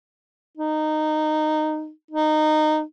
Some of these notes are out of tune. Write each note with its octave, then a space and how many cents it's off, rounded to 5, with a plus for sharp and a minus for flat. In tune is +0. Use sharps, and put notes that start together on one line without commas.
D#4 -15
D#4 -20